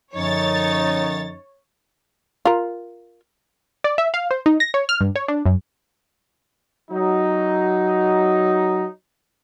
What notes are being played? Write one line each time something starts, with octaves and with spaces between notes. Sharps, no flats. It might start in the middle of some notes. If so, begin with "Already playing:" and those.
F#2 D3 F3 D#4 C#5 A6
F4 A#4
D5
E5
F5
C5
D#4
A#6
C#5
F6
G2
C#5
D4
F#2
F#3 D#4